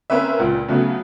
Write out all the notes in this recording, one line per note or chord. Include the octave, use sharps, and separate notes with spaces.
A#3 C4 C#4 B4 E5
C#2 A#2
C#3 F#3 A3 B3 C#4